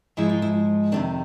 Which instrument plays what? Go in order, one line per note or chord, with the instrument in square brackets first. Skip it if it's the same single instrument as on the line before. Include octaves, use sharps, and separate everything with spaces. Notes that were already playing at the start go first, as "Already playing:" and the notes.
[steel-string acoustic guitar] G#2 F3 G#3 E4
F4
E4
F2 C3 D#3 D4